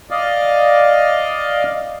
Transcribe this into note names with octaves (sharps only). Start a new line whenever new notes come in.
D5 D#5 F5